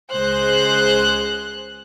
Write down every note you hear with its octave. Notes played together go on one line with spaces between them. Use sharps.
C#2 G#3 C5 F#6